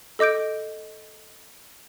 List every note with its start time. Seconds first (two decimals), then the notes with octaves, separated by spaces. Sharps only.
0.19 A4 D#5 D6 G6 D7